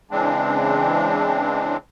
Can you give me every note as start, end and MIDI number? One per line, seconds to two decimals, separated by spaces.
0.11 1.77 49
0.11 1.77 52
0.11 1.77 56
0.11 1.77 60
0.11 1.77 62